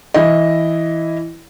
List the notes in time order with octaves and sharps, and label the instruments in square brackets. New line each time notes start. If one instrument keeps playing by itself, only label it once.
[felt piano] E3 E4 D#5